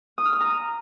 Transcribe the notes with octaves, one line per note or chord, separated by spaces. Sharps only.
D#6
F6
D#6
A#5